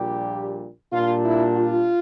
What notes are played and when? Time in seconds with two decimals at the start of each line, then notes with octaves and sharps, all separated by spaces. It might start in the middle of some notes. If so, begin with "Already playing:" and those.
Already playing: A#1 A#2 G3 G4
0.92 A#2 G3 D4 F4
1.23 E4
1.54 F4